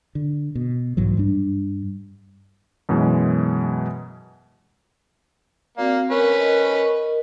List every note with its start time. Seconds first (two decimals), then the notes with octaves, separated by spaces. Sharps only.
0.15 D3
0.55 B2
0.97 B1 G#2 E3 F#3
1.17 G2 G3 D4
2.89 F#2 B2 E3 G#3
5.78 A#3 C4 F#4 D5
6.10 C#4 A#4 B4
6.39 A#4 D#5